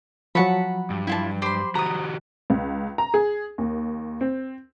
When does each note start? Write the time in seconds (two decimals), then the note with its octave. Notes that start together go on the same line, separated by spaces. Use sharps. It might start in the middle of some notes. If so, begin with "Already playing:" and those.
0.35 F3 F#3 F#5 A5 B5 C#6
0.90 G2
1.07 E4 F4 A5
1.42 G4 C5 B5 C6 D6
1.75 D#3 F#4 G4 A#5 D#6
2.50 C#2
2.98 A#5
3.14 G#4
3.58 D#2
4.21 C4